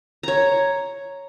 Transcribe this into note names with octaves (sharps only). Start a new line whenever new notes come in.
C#5 A#5